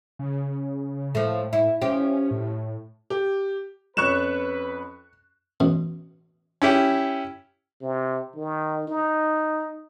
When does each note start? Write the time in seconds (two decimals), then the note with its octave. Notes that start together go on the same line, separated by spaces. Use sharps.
0.19 C#3
1.15 A2 F3 A3
1.53 E4
1.82 F3 C#4 G4
2.31 A2
3.10 G4
3.97 F2 C#4 B4 C#6 F#6 E7
5.60 A1 B2
6.62 C#4 E4 G4
7.82 C3
8.36 D#3
8.88 D#4